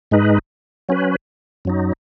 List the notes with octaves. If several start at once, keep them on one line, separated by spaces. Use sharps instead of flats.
G#2 G#3 D#4 B4
F#3 C#4 B4
F#2 F#3 D#4